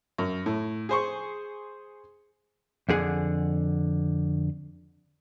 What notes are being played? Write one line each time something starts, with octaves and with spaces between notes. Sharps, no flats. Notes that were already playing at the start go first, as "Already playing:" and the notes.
F#2
A2
G#4 C5 C#6
F2 D3 G#4 F#5